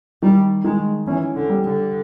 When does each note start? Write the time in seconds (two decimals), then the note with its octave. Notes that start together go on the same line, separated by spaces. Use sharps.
0.22 D#3 G3
0.64 D#3 G#3
1.07 E3 C#4
1.35 D3
1.50 G3
1.64 D3